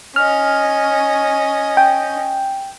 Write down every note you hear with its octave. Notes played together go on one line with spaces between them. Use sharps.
C#4 D#5 F6
G5